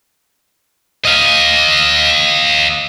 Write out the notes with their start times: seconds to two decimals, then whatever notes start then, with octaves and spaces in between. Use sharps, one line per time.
1.05 D#5 F5